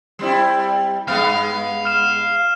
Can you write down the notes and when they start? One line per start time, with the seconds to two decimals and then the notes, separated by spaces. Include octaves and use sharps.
0.19 G3 C4 E4
1.08 G2 G#3 B3 F5
1.85 F6 E7